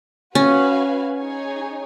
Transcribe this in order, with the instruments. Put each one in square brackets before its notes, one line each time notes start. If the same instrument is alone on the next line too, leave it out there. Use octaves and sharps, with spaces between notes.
[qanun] C#4 [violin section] F#4 B4 F5 G#5
[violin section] D#4 G#4 C#5 G#5